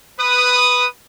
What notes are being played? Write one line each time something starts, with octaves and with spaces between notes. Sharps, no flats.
B4 D#6